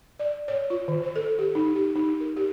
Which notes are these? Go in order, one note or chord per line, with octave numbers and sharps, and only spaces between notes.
D5
C#5
F4
D#3
C5
A4
G4
D#4
G4
D#4
A#4
G4